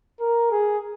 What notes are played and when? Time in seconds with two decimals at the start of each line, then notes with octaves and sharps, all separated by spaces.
0.20 A#4
0.51 G#4